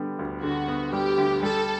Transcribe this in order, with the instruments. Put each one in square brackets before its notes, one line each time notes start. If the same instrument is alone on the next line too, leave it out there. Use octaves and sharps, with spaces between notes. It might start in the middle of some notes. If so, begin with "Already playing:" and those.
Already playing: [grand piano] D3 G3 B3
D2
[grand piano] D3 [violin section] F#4
[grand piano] B3
[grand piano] G3 [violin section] G4
[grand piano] D2
[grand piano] G3 [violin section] A4